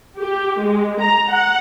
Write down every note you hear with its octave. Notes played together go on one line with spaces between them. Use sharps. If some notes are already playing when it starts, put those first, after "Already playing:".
G4
G#3
A#5
F#5